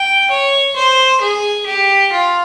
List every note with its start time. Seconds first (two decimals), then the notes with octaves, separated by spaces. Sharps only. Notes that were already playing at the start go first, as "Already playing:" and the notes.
Already playing: G5
0.31 C#5
0.76 C5
1.21 G#4
1.66 G4
2.12 F4